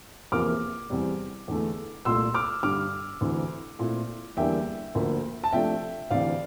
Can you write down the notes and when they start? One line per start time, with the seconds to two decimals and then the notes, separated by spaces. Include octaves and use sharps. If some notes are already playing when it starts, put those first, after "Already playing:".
0.32 E2 C3 F3 A#3 E4 D6 F6
0.90 E2 C3 G3
1.48 E2 D3 A3
2.05 C2 A#2 A3 C6 E6
2.34 D6 F6
2.63 G2 D3 G3 D6 F6
3.21 D2 C3 E3
3.79 A#2 A3 C4 E4
4.37 E2 D3 G3 A#3 D4 E5 G5
4.95 D2 D3 F3 A#3
5.44 A5
5.53 C3 F3 A3 D4 E5 G5
6.10 D2 C3 E3 D5 F5